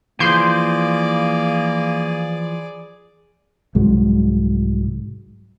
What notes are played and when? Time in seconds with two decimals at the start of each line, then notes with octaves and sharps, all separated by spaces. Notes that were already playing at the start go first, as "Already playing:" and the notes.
0.20 E3 F3 A#3 G#4 D5 C6 G6
3.75 C2 G#2 F#3 G#3